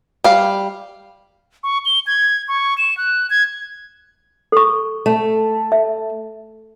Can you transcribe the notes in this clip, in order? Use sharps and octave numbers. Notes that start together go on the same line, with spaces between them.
G3 F5
C#6
G7
G#6
C#6
E7
F#6
G#6
A4 C#6
A3
E5